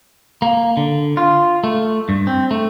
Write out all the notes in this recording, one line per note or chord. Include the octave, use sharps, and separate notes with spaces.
A#3
D3
F4
A3
G2
C4
A3